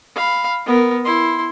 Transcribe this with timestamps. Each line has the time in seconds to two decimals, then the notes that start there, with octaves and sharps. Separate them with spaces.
0.16 F5 B5
0.66 B3 A#4
1.05 E4 C6